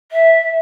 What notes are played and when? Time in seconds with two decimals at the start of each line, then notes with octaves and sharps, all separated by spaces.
0.12 E5